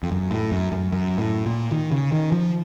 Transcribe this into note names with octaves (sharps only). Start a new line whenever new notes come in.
F2
F#2
A2
F#2
F#2
F#2
A2
A#2
D#3
C#3
D#3
F3